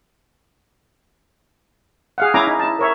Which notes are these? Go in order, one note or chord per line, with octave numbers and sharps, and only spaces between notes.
G#4 F5 F#5
C#4 E4 G#5 A#5 D6
D#4
E4 A5
A#4 C#5 E5